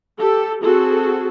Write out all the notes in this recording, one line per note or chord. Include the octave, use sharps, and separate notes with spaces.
G4 A4
C4 F#4 G#4 A4